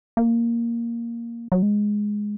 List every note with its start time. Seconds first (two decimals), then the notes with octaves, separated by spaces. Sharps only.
0.17 A#3
1.52 F#3
1.63 G#3